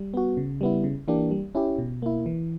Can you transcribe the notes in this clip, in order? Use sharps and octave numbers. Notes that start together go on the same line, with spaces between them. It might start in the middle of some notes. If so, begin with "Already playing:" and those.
Already playing: G3
B3 F#4
C#3
G3 B3 E4
C#3
E3 A#3 D4 G4
G3
C#4 E4 G4
B2
A#3 E4
E3